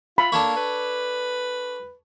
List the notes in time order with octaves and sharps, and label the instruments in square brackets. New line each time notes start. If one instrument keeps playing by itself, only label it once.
[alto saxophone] F4 [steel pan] B5
[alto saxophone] A#3 [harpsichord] D4 A4 C#5
[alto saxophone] B4